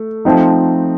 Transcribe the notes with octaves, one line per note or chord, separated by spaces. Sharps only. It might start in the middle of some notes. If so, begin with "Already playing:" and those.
Already playing: A3
F3 A3 C4 D#4